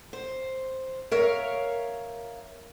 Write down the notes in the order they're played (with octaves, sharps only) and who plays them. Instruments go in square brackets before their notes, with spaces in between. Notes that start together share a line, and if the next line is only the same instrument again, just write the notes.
[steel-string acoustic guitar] C5
A#4 C#5 E5 F5